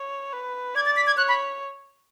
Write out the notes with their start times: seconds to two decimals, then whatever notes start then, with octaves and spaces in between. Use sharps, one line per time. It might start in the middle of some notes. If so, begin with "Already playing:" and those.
Already playing: C#5
0.32 B4
0.75 D5 G#6
0.86 A6
0.96 B6
1.07 G#6
1.17 C#5 F#6
1.28 B5